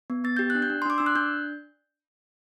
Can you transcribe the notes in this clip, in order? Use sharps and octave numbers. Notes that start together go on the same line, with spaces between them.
B3
B3 A6
G4 G6
F#6
D4
G6
D4
C6
D4 D6
D4 E6
F#6
D4 G6